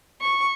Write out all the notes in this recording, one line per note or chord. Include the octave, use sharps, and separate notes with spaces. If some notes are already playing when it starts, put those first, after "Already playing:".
C#6